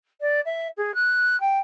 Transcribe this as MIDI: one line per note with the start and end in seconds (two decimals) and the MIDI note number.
0.21 0.41 74
0.45 0.68 76
0.77 0.94 68
0.94 1.39 90
1.40 1.59 79